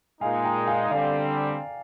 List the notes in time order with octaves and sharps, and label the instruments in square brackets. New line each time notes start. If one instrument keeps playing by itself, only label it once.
[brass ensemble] A#2 G#3 D#4 [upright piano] F5 G#5
[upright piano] G5 A#5
F5 G#5
[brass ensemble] D3 G3 C4 [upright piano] D5 F5